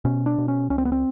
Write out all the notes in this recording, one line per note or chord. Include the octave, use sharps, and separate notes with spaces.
B2 C#4
D4
B2
C#4
C#2 C#4
C4
B3
C4